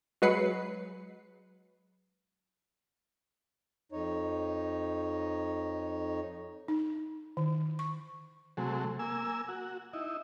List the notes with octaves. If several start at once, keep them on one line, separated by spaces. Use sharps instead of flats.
F#3 G#3 B4 C7 C#7
F2 D#4 C#5
D#4
D#3
C#6
C3 F#3 G#3 A3
A#3 G#5 E6
F#4
D#4 E4